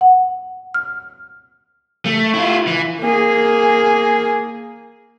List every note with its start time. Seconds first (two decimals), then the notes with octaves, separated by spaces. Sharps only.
0.01 F#5
0.74 F6
2.05 A3
2.34 E4 F4
2.67 E3
3.00 A#3 G#4